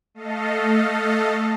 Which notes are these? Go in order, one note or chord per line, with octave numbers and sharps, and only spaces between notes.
A3 A4 D#5 F5